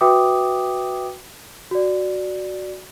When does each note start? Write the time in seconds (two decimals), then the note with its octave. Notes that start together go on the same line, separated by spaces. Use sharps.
0.01 F#4 B4 E5 G5 D6 D#6
1.71 F#4 D5